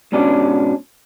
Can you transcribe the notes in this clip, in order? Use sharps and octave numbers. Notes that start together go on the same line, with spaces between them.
G#2 B2 C#4 D4